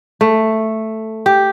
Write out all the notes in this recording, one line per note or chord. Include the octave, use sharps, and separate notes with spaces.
A3
G4